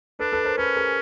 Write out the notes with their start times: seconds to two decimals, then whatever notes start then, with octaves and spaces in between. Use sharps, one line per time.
0.19 D4 A4 B4
0.32 A4 B4
0.45 A#4 C5
0.57 C#4 A4 B4
0.76 G#4 A#4